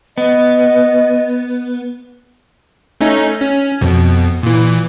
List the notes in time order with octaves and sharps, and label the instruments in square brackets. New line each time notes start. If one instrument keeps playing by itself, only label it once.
[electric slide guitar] B3 [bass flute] D#5
[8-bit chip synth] A3 C#4 D#4
C#4
F2 B2
A#2 E3